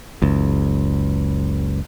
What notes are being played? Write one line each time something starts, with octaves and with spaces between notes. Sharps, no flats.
F#1 C#2